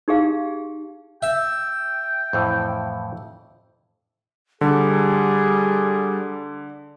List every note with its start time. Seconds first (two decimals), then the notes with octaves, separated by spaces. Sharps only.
0.08 D#4 G4 G#4 F5
1.23 E5 G5
2.33 F2 A2 E3
4.61 D3 G3 G#4